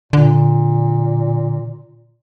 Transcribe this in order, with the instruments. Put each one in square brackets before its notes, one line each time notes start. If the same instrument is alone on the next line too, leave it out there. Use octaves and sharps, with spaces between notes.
[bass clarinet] A#2 [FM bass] D3